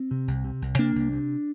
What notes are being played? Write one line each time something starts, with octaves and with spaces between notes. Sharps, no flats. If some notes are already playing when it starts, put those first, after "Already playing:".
Already playing: C4
C3
C2
C3
C2
C3 A#3 D4
C2
C3